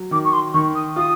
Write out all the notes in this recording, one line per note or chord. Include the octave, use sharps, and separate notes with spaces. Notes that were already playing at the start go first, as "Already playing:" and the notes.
Already playing: F#3
D#3 D6
C#6
C6
D#3 C#6
D#6
F4 D#6